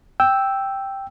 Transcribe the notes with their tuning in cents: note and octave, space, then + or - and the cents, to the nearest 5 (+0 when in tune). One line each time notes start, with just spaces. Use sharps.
G5 +0 E6 +0